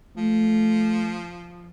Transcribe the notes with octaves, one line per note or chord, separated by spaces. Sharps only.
F3 A3